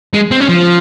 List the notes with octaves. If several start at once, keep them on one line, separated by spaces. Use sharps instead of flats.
G#3
C4
C#4
F3